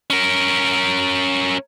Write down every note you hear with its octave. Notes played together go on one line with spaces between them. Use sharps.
C#4 A#4